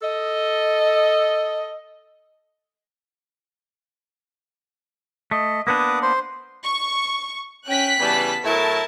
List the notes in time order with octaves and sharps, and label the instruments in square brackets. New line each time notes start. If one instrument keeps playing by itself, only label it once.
[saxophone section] A4 D#5
[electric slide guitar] A3 [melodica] D#5
[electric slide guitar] A#3 B3 D4 [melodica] B4 D6 D#6
[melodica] C5 C6
[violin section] C#6
[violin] C#4 G5 [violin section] F#6 B6
[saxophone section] C#3 E3 G3 [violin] B3 A5
[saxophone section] A2 F#3 E4 [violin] A#4 [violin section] A5